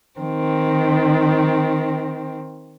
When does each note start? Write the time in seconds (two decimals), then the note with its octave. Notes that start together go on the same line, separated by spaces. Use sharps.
0.20 D#3 C4